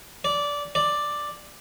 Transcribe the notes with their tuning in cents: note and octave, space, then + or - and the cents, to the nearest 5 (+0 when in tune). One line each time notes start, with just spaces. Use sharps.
D5 -15
D5 +5